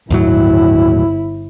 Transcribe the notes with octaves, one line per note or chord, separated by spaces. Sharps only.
G1 D#2 A2 F#3 E4